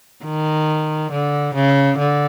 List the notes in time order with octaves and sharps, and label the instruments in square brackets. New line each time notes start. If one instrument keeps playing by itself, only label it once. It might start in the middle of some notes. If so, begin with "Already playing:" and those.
[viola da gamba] D#3
D3
C#3
D3